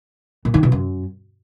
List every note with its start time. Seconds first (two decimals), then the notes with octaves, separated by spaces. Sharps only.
0.45 A#2
0.54 D#3
0.63 B2
0.72 F#2